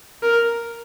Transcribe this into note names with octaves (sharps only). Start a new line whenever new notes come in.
A#4